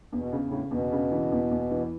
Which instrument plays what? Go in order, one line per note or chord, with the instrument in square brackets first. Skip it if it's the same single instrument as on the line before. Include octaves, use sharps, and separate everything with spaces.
[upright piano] E2
[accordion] B2
[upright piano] C#3
[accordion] A2
[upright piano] C#3
[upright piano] E2 [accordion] B2
[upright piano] C#3
E3
E2
E2
E3